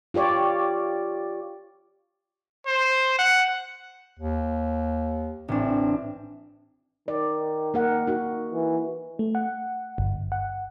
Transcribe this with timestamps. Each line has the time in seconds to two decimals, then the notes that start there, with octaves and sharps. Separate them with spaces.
0.14 F4 G4 C#5 D5
2.66 C5
3.19 F#5
4.19 D#2
5.48 A1 C4 D4
7.08 D#3 D5
7.74 A#3 A#4 F#5
8.07 D#4 F#4
8.53 E3
9.19 A3
9.35 F#5
9.98 G1
10.32 F#5